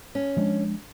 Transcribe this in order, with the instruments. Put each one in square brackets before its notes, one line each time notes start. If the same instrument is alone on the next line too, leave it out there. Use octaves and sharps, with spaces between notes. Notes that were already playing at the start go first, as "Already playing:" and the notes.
[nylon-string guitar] C#4
[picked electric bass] F3 G#3 D4